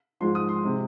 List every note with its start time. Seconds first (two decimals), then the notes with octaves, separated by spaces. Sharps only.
0.20 G#2 F3 G#3 C6
0.35 D#6
0.49 C6
0.63 C3 G#3